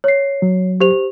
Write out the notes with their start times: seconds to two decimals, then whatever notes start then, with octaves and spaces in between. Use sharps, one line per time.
0.04 C#5 C7
0.42 F#3
0.80 G4 C5 F7